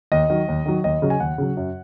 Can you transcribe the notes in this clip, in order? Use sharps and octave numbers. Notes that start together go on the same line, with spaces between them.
D#2 D#5
D#3 F#3
D#2
D#3 F#3
D#2 D#5
C#3 F#3
G#5
D#2 F#5
C#3 F#3
F#2